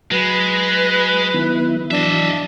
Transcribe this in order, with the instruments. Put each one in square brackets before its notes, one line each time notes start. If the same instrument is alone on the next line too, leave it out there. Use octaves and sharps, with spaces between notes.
[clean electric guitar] F#3 [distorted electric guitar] G#3 [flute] B4 [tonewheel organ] A#6
[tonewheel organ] D#3 B3 E4
[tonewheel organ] E3 F#3 [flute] D4 [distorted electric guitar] D#5 E5